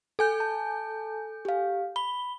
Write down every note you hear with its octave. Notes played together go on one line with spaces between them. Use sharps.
A4 G#5 G6
A5
G4 F5
B5 G7